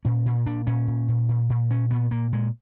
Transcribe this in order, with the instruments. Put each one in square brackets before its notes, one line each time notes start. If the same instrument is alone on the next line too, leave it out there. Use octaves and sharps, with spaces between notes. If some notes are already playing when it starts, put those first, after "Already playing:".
[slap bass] A#2 C#4
A#2
A#2 D4
A#2 C#4
A#2
A#2
A#2
A#2
A#2 C#4
A#2 B3
A#2 A#3
A#2 G#3